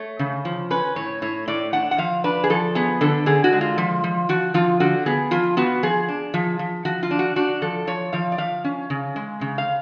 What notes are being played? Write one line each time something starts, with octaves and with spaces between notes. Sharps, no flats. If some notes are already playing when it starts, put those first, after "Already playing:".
Already playing: A3 C#5
C#3
F3
C#4 B4
A2 C#5
A2 C#5
A2 D5
D4 F#5
F#5
F3 F5
D4 B4
G#4
F3 A4
B3 G#4
D3 A4
D3 G#4
F#4
G#3
F4
F3
F3
F3 F#4
F3 F4
D3 F#4
B3 G#4
F3 F4
B3 F#4
F3 G#4
D4
F3
F3
F3 F#4
F4
D4
F#4
D4 F#4
F3 A4
F3 C#5
F3 F5
D5
F3 F5
C#4
C#3
G#3
C#3
F5